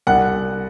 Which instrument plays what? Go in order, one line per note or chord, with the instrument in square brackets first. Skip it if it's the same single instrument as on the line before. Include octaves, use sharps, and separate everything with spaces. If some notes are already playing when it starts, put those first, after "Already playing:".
[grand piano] C2 [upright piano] F#5